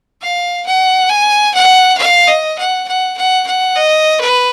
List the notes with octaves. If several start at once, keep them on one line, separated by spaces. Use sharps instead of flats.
F5
F#5
G#5
F#5
F5
D#5
F#5
F#5
F#5
F#5
D#5
B4